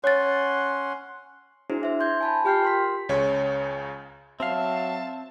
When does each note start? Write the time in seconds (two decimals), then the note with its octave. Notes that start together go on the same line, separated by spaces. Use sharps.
0.04 C#4 C#5 F#5 C6 A6
1.70 D4 E4 F#4 G#4 C5
1.83 C5 E5
1.99 C6 G6 G#6
2.21 G#5 A5 B5
2.44 F4 G4 G5 F6 G6 C7
2.63 A#4 C6 B6
3.09 C#2 C#3 C#5
4.40 F#3 C4 E5 F5 A5